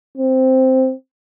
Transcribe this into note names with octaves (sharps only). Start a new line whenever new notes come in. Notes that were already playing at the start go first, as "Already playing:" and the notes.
C4